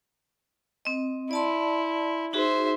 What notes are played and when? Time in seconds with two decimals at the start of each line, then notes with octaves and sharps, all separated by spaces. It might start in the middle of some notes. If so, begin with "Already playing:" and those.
0.85 C4 D#5
1.31 E4 D5 A5 C6
2.33 D#4 F#4 G#4 C5 E5